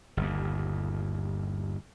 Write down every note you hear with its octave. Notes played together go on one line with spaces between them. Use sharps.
G1 D#2